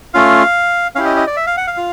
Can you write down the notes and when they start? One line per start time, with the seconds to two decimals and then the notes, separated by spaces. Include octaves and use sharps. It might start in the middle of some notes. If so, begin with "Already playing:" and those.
0.14 A3 C#4 F4 F5
0.95 C#4 E4 G4 F5
1.05 D#5
1.17 D#5
1.27 D5
1.36 E5
1.47 F5
1.57 F#5
1.67 F5
1.77 F4